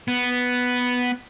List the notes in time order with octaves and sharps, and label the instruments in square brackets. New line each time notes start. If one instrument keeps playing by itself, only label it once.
[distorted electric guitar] B3